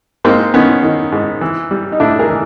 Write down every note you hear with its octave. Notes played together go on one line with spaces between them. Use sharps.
G#2 A#3 C4
D#3 B3 C#4
D#3
G#2
E3
G3
D#4
A2 D4 E4
G#4 A#4
E3